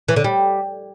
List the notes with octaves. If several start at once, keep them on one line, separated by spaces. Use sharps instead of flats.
E3
D3
G3